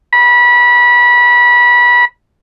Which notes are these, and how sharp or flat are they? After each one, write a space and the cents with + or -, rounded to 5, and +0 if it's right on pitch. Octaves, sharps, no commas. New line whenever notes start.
B5 -25